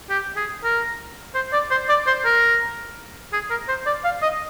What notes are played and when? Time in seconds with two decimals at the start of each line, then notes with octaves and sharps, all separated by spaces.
0.10 G4
0.36 G#4
0.64 A#4
1.35 C5
1.53 D5
1.71 C5
1.89 D5
2.07 C5
2.25 A#4
3.33 G#4
3.50 A#4
3.68 C5
3.86 D5
4.04 F5
4.22 D#5